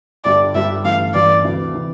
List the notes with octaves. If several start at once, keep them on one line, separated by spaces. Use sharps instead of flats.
G1 G2 D3 G3 D4 D5
G1 G2 D3 G3 D4 E5
A1 G2 E3 A3 F5
A1 G2 E3 A3 D5
D2 C3 E3
C3 E3